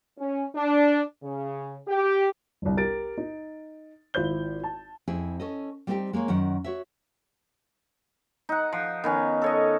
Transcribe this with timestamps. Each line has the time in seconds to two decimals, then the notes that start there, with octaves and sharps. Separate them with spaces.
0.18 C#4
0.55 D4
1.23 C#3
1.88 G4
2.62 G1 C2
2.77 G4 A#4 A6 D7
3.18 D#4
4.14 G#1 E4 F4 C5 G6 G7
4.64 A5
5.08 F2 C4 E4 G#4
5.40 C#4 A4 D#5
5.87 G3 B3 C4 D#4 G4 D5
6.13 G#3 A#3 G#4 C#5
6.28 F#2 D#3 F#5
6.64 F#4 C#5 E5
8.49 D#4 F#5
8.73 F3
9.04 D#3 B3 C#4
9.42 A4 C#5 D#5